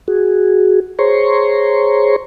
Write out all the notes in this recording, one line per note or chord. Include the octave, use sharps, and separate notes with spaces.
F#4 G#4
G#4 C5 C#5 A#5 C6 C#6